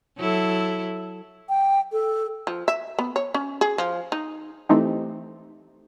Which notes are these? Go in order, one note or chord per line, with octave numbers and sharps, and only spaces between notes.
F#3 E4 A4
G5
A4
F3
E5
B3
C#5
C#4
G#4
F3
D#4
E3 A3 C4 D#4 G4